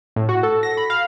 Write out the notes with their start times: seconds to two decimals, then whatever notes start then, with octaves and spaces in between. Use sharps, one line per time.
0.16 A2
0.29 F#4
0.43 A4
0.63 A#6
0.77 B5
0.90 F5